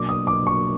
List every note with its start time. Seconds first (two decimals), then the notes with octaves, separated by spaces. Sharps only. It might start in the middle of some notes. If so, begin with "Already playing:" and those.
Already playing: B2 F#3 A#3 D4 D6
0.09 D#6
0.27 D6
0.47 C#6